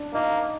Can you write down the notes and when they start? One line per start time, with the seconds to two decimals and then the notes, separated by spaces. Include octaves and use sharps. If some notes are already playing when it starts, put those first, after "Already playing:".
Already playing: D4
0.14 A#3 D#4